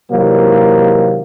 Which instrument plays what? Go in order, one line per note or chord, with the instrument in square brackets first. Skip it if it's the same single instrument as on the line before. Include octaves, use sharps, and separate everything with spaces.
[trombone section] C3 D#3 E3 F#3 G#3 A#3